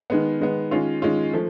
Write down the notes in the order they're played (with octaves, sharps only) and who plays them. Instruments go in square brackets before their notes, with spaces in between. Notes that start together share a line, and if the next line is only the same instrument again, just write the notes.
[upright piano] D#3 G#3 B3
D#3 G#3 B3
D#3 G#3 C#4 F4
D#3 G#3 C#4 F4
F3 A3